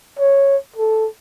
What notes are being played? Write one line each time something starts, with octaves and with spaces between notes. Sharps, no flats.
C#5
A4